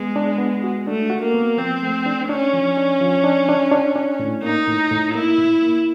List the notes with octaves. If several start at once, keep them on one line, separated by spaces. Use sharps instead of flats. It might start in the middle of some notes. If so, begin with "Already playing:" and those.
Already playing: G#3 B3
D4
B3
F#4
A3 D4
F#4
A#3
B3
F3 C4
A3
D4
C#4 D4
F3
D4
F3
D4
D4
D4
D4
A2
A#3 D#4
A2
A2
A#3 E4
A2
A#3